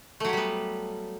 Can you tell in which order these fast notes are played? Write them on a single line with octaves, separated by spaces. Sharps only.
A3 F#3 G4 G3 B3